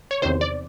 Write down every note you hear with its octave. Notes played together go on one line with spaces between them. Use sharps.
C#5
E2 C3 D#3 C5
D5